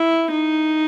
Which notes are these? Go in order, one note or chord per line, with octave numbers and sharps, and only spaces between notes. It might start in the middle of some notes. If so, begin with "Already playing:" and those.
Already playing: E4
D#4